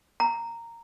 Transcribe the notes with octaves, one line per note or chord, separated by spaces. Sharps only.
A#5